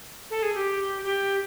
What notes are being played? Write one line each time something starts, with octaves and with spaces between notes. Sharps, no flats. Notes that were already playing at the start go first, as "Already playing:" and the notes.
A4
G#4
G4
G4